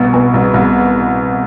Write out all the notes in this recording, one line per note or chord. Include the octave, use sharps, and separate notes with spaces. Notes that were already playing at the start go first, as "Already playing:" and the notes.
Already playing: C2 B2
B2
C2
C2